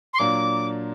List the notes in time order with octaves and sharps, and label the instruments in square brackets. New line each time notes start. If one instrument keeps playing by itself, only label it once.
[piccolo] C6
[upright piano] A#2 F#3 A#3 D4 [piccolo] D6